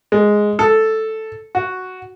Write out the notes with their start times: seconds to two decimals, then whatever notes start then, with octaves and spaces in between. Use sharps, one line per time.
0.12 G#3
0.59 A4
1.55 F#4